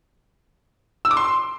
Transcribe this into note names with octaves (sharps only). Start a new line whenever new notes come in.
E6
D6
C6